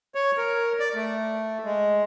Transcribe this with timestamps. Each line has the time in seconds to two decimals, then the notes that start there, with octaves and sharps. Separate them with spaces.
0.15 C#5
0.37 A#4
0.80 D5
0.95 A3
1.65 G#3